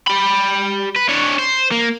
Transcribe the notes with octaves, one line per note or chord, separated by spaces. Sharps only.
G4 B5
B4
D4 C#5
C5
A#3